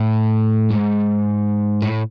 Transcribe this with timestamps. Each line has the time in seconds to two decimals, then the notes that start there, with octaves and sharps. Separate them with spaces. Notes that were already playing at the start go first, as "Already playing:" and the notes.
Already playing: A2
0.70 G#2
1.82 A2